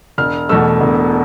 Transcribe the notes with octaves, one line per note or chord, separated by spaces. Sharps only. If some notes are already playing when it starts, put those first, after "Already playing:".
E1 F6
E2 B2 A3 E6
E1